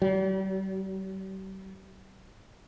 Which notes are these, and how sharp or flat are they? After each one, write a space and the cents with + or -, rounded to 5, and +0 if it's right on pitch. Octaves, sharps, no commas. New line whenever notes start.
G3 -40